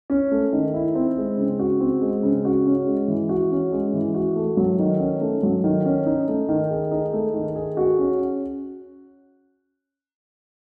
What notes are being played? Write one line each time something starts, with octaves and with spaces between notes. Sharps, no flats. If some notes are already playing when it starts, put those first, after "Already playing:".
C#4
A3
D#3
E4
C4
G#3
C#3
F#4
C4
G#3
C#3
F#4
C#4
G#3
E3
F#4
C#4
G#3
E3
F#4
A3
F#3
D#3
C#4
A3
F#3
D#3
C#4
D#4
A3
D#3
G#4
D#4
A3
D#3
G#4
F#4
C#4